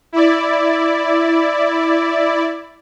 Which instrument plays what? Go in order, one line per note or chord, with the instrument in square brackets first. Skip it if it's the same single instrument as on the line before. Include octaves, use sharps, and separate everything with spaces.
[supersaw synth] E4 D5